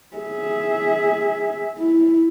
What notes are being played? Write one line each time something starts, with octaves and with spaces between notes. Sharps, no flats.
G#4 E5
E4